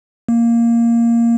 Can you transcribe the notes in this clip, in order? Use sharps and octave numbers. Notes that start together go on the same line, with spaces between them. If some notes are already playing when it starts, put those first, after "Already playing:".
A#3